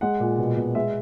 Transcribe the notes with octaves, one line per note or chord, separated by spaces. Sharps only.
G#3 F#5
A#2
B2
B2
G#3 E5